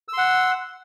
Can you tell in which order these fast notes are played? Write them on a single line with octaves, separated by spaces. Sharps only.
E6 C6 F#5